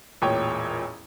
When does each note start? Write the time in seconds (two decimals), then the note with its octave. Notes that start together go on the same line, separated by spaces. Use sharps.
0.22 E1 A1 A#2 C#5 G5